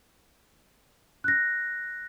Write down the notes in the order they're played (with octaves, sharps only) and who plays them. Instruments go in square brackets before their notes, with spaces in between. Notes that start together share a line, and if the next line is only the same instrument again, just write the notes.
[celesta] F#6 A#6